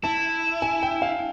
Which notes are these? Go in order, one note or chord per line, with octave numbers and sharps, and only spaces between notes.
E4 A5
G#5
G5
F5